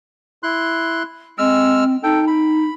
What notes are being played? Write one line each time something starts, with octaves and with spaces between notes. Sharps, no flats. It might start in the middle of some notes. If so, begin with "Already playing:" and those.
E4 C6 F#6
G#3 C4 E6 F6
D#4 A4 G5
B5